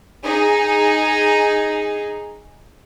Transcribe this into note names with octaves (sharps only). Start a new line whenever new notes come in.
D#4 G#4